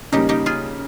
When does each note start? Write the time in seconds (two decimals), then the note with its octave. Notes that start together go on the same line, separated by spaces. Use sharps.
0.12 C#3 G3 A#3 D#4 G4
0.29 D#4 G4
0.46 F4 G#4